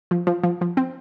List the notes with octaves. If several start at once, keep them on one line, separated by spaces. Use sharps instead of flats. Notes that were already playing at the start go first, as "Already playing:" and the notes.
F3
F3
F3
F3
C4